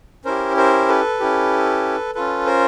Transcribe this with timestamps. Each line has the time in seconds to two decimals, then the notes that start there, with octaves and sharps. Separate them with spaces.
0.25 C#4 E4 G4 A#4 C5
0.57 A#4 C5
0.88 A4 B4
1.20 C#4 E4 G4
2.15 C#4 F4 A4 B4
2.46 A#4 C5